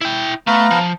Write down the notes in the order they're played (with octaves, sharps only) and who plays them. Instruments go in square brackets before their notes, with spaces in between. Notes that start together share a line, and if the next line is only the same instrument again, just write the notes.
[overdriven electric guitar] E4 G5
[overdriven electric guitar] A3 [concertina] B3 F5 A#5
[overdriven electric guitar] F3